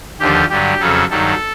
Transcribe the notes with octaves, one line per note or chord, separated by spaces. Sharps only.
D#2 D3 F3 G4
G2 D3 F#3 G4
F2 C#3 F#3 A4
G2 D#3 F#3 A4